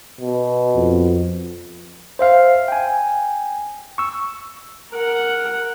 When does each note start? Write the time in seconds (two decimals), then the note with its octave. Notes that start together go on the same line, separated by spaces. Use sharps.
0.21 B2
0.75 F2
2.19 C5 E5 F5
2.68 G5 G#5
3.98 C#6 E6
4.92 A#4 F#5